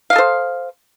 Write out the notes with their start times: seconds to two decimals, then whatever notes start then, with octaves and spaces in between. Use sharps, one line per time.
0.10 F5
0.13 D#5
0.16 A4
0.18 C5